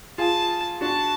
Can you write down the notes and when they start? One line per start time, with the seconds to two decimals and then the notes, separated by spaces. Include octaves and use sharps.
0.18 F4 G#4 A5
0.81 D4 F#4 A5